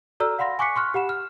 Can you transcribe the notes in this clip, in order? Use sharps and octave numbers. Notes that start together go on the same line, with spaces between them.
F#4 A4 D5 A#5 E6 F6
F5 F#5 B5 C6 A#6
G#5 C#6 D6 F#6 B6 C#7
C6 C#6 F6 F#6
G4 F#5 B5 E7
F6